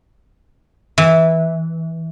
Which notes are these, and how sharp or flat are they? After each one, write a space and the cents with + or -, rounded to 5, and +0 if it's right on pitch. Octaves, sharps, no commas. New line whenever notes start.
E3 -15